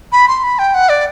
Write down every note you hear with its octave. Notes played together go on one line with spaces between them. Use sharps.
B5
C6
B5
G5
F#5
D5